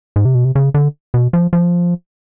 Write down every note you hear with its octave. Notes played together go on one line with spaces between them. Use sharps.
G#2
C3
B2
C3
C#3
D3
B2
F3
F3